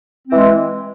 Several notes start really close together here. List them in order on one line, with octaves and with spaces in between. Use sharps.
C4 E3 G#3